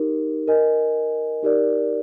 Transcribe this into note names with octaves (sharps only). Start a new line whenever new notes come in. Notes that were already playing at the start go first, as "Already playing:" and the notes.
Already playing: D#4 G4 A#4
A#4 D#5 G#5
D#4 G4 A#4 D5